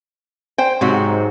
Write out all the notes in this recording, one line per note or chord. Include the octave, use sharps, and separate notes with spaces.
C5 G5
G#2 C3 F#3 F#4